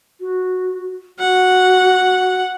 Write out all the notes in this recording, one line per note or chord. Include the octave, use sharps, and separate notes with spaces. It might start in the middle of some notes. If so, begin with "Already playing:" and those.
F#4
F#4 F#5